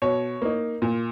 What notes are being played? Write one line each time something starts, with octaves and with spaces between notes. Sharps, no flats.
B2 C#5
A#3 D#4
A#2